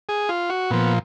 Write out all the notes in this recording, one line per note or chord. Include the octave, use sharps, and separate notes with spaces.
G#4
F4
F#4
A#2 F3 B3